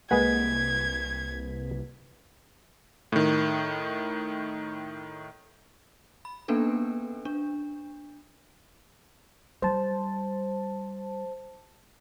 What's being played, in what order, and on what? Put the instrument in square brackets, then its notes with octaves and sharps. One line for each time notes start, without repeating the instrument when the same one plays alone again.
[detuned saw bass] C2 [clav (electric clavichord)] G#3 G#4 F#5 [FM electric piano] A#3 B4 B6 [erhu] G#6
[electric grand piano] A2 D#3
[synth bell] B5
A#3 B3 C#4 D4 A4 B4
D4
[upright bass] G3 [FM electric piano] C5 A5